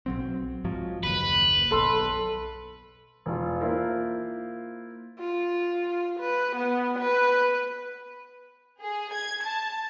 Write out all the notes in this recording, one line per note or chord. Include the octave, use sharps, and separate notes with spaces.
B1 F#3 C4
G#2 F3 F#3
F#1 D#2 B4
B1 A4 C6 E6
E1 F4
A#3 E4 F4 A#4 C5
F4
B4
B3
B4
G#4
G#6
A5